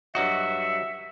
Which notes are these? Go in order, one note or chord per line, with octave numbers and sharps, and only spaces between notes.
G2 F#3 F#4 D#5 E5